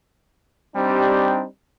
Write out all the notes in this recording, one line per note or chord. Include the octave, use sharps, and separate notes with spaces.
G3 C4 D4 D#4 G4